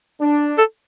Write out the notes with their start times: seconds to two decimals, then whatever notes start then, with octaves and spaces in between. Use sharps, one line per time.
0.20 D4
0.58 A4